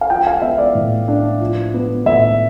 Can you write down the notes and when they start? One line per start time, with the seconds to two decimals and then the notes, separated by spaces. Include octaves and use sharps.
0.01 F5
0.10 F3 G5
0.27 F5
0.42 B3 E5
0.58 D5
0.75 A2
1.08 D4
1.41 F3
1.74 B3
2.06 A2 E5